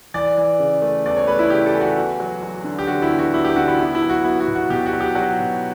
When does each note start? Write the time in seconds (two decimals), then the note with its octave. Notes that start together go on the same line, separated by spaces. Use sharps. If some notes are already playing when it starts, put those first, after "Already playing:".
0.14 E3 D5
0.37 E3
0.60 C#3
0.82 A3
1.06 E2 D5
1.17 C#5
1.27 A3 B4
1.39 E4
1.50 C#3 G4
1.66 A4
1.74 E3
1.81 F#4
1.97 E2
2.20 F#3
2.43 F#3
2.64 D3
2.79 G4
2.87 D3 F#4
3.02 E4
3.11 E2
3.19 F#4
3.34 E2 E4
3.45 G4
3.56 D3 F#4
3.68 E4
3.79 B3 E4
3.95 E4
4.02 F#3
4.10 F#4
4.24 B3 E4
4.40 F#4
4.47 B2
4.55 F#4
4.70 B2 G4
4.86 F#4
4.93 F#3
5.01 G4
5.15 F#3 F#4
5.39 B2